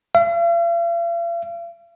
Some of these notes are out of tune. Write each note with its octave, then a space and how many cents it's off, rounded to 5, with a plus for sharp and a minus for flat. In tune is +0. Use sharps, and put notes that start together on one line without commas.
F5 -45